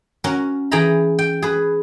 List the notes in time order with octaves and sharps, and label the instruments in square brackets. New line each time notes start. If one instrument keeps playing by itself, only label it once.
[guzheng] C#4 F#4 A#4
E3 G#4 G5 G#5 A#5 B5
G5
G#4 B4